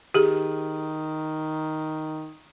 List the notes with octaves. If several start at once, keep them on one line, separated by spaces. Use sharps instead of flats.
D#3 G4 G#4